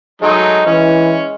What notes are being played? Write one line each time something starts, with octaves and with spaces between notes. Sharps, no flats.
F#3 G#3 A3 D#4
E3 C#4